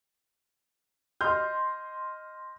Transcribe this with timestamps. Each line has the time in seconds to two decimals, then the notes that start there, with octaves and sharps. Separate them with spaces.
1.21 D#5 C6 F6 G6